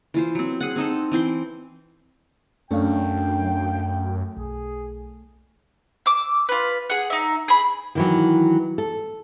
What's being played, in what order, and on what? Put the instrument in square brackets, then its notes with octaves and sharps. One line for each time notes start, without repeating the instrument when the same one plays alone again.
[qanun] E3 F4 C5
F#3 C4
G#4 F#5
C4 D#4 A4
E3 C4 G5 C6
[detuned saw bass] F#2 [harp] A3 [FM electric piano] C#4 D4 F5 [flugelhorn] G5
[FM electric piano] B1 [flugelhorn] G#4
[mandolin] D6 E6
F4 B4
G#4 F#5
D#4 E5
G#4 B5
[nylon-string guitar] D#3 E3 F#3
A4